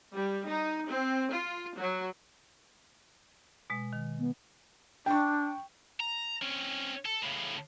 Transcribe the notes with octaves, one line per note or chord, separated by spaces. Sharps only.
G3
D#4
C4
F4
F#3
B2 G#3
D#3
B3
D4 G5 C#6
A#5
C4 C#4
A4
A2 C#3